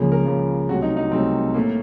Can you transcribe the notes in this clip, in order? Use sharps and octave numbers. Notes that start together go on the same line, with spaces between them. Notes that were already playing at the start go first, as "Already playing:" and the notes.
Already playing: C#2 C#3 F3 A#3
A#4
C#2 C#3 F3 A#3
C2 C3 F#3 A3 F#4
D#4
D#4
C2 C3 F#3 A3 C4
A2 A3 A#3